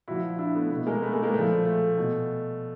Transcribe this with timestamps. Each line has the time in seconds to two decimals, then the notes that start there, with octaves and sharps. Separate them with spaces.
0.08 A#2 F3 E4 F#4
0.39 D4 E4
0.55 A3 B3
0.71 B2 A3 B3
0.87 G#3 A#3
1.02 A3 B3
1.12 G#3 A#3
1.23 G#3 A#3
1.34 A#2 F3 A3
1.65 A3
1.97 B2